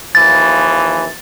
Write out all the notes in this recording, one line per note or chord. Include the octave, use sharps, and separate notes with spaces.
D#2 E3 F3 A6